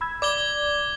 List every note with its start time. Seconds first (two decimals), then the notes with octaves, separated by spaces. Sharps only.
0.01 B5 E6 G#6
0.22 D5 D6 G#6 G7